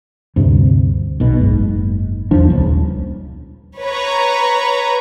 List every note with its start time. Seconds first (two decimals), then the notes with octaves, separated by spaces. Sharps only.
0.36 D2 G2 C3
1.20 B1 B2
1.39 F#1 G#2
2.31 B1 E2 F3 D4
2.49 D#1 C#2 C#3
3.81 B4 C#5 A#5